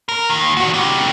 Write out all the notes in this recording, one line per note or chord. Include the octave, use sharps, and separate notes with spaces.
A#4
D#2 D#3
D#3 F#4
C#3 G4